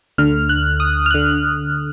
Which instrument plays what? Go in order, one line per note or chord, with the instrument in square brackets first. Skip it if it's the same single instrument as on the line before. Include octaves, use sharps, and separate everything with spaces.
[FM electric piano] D2 D3 F6
F#6
D#6
F6
D3 F#6